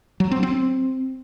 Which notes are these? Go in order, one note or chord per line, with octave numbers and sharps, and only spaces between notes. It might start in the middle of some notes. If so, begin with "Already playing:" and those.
F#3
C4
C4